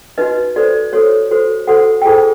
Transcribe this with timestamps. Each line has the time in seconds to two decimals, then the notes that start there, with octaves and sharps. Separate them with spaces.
0.18 D#4 F#4 B4 D#5
0.56 F#4 A4 C5 D5
0.93 F#4 A4 C5 C#5
1.31 F#4 A4 C5
1.67 F#4 A4 C5 F#5
2.02 G5
2.05 F4 G#4 A4 C5 G#5